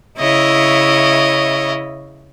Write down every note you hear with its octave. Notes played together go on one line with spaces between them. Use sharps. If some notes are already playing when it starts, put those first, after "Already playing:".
C#3 E4 C#5 D#5 E5